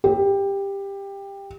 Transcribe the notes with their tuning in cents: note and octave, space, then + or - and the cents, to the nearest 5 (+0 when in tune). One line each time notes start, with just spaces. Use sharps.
G4 +15